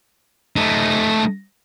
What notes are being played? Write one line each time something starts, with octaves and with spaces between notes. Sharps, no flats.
A3 D#4